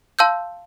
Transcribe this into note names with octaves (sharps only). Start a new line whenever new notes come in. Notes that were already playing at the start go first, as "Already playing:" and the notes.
F5 A5 C6 E6 G6